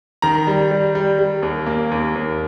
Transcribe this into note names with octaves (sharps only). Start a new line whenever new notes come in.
D#3 A#5
G3
G3
G3
G3
D#2
A#3
D#2
D#2